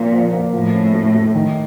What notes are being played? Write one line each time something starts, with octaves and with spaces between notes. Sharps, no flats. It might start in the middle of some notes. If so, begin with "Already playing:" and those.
Already playing: A#2 F3 A#3
F3
A#3
A2 F3
C#4
A3
A3
D#3